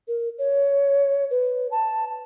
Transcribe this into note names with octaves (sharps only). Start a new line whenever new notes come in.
A#4
C#5
B4
A5